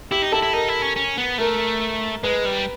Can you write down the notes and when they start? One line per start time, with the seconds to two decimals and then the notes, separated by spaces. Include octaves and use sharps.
0.11 E4 G4
0.22 D#4
0.32 E4 A4
0.42 E4
0.53 D#4 A#4
0.68 E4
0.82 C#4
0.96 C#4
1.18 B3
1.38 A3 A#4
2.23 G#3 B4
2.45 G3